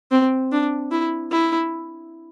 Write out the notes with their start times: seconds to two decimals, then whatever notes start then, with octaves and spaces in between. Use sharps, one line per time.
0.12 C4
0.52 D4
0.92 E4
1.31 E4